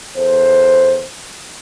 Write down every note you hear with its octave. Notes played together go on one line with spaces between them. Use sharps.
E2 A4 C5